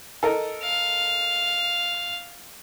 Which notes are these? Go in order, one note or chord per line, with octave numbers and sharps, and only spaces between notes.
A4 A#4 D#5
F5